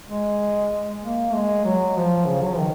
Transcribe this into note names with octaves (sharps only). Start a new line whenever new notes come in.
G#3
A#3
G#3
F#3
F3
C#3
F#3
F3
D#3